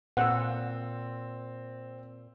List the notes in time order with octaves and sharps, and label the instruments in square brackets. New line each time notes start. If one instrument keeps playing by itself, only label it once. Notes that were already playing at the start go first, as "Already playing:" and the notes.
[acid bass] A#2 [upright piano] C4 E6 [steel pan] F#5